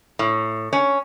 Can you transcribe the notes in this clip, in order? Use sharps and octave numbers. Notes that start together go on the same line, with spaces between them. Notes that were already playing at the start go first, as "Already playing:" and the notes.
A2
C#4